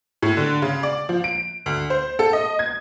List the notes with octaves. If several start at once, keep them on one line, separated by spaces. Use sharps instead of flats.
A2
D3
C#3
D5
F3
D7
D2
C5
A4
D#5
G#6